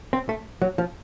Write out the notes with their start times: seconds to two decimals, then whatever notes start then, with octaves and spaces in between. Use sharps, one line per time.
0.13 C4
0.29 A3
0.62 F#3
0.78 F3